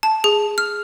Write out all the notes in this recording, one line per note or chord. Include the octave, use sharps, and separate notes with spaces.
A5
G#4
F6